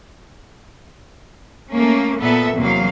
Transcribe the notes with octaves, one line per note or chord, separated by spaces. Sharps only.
A3 A#3 C#4
A#2 B3 A4 E5
E2 C3 F#3 A#3 F5